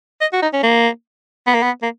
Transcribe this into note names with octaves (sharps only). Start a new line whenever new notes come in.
D#5
F#4
D#4
C#4
A#3
B3
A#3
B3
A#3